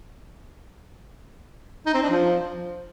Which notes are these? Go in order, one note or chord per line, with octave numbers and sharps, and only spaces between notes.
D#4
C4
D4
F3